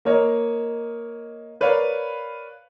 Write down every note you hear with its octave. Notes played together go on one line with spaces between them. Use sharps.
A#3 A#4 C#5 D#5
A#4 B4 C#5 D5 F5